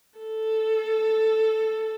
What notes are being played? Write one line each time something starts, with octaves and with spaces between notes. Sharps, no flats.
A4